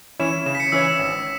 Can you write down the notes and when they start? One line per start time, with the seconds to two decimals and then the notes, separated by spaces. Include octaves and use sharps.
0.19 E3 C#4 E4 C#5 E7
0.46 C#3 E7
0.55 B6
0.60 C#7
0.72 E3 C#4 E4 C#5 E6
0.85 E6
0.99 G#1